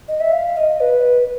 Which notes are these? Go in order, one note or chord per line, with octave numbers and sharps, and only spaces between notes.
D#5
E5
F5
D#5
B4